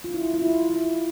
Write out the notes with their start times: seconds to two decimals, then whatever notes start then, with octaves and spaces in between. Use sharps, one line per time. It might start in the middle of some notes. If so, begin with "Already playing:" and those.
0.04 F4
0.14 E4
0.34 E4
0.42 F4
0.70 E4